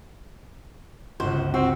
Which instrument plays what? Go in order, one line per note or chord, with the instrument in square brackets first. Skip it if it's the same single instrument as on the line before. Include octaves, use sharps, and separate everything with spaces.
[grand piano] G1 C#2 [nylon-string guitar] F#4 [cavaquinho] C5
[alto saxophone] C4 [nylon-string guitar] F#4